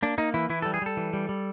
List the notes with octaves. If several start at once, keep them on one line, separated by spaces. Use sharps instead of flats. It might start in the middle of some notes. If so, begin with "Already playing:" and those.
A#3 D4
A#3 D#4
E3 E4
E3 E4
G3 A4
G#4
G3 A4
E3
G3
G3